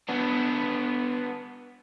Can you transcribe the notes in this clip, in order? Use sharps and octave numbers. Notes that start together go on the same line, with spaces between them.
B3 D4